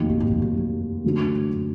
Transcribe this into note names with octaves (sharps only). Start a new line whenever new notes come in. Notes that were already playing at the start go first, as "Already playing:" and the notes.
Already playing: F1 D#2 D#3 F#3
A#2
G#2
F2
F#2
F#2
D2 D3 F#3 D4
F#2